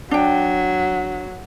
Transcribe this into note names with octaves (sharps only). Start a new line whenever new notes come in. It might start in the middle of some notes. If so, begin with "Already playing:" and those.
F#3 D4 G5